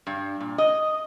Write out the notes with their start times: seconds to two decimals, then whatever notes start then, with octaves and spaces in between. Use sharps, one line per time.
0.07 G2
0.40 A#2
0.58 D#5